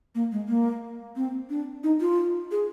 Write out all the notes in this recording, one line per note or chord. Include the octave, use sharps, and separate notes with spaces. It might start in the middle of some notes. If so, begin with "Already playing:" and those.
A#3
G#3
A#3
C4
D4
D#4
F4
G#4